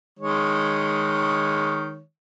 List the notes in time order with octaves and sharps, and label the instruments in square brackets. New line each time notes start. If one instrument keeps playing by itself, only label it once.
[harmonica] D#3 G#3 C#5